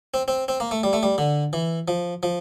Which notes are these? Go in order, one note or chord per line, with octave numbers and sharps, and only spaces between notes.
C4
C4
C4
A#3
A3
G3
A3
G3
D3
E3
F3
F3